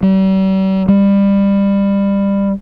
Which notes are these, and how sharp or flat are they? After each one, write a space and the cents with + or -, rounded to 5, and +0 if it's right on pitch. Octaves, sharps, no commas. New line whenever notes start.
G3 -40
G3 +25